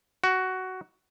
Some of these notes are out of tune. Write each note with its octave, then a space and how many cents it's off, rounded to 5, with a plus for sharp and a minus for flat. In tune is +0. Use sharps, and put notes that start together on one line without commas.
F#4 +10